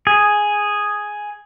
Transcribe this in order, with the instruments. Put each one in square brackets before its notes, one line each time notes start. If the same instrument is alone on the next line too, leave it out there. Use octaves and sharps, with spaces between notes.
[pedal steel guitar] G#4